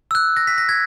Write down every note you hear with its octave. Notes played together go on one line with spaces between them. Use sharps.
E6
F#6
A#6
B6
A#6
G#6